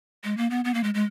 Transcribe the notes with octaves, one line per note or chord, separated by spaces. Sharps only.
G#3
A#3
B3
B3
A#3
G#3
G#3